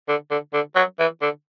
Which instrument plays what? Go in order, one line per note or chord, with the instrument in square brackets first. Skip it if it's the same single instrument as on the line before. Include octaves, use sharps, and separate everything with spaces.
[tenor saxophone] D3
D3
D3
F#3
E3
D3